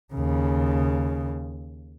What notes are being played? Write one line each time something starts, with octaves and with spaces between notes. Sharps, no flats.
D#2 C#3